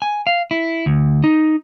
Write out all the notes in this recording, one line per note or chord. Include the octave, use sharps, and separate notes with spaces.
G#5
F5
E4
D2
D#4